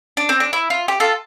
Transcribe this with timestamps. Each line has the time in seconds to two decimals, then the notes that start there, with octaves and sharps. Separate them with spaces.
0.17 D4
0.29 C4
0.40 D4
0.53 E4
0.70 F4
0.88 G4
1.00 F4 A4